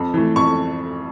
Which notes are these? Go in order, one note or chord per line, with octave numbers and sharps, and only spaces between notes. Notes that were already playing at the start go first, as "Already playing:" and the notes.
Already playing: F2
E3 A3
F2 C#6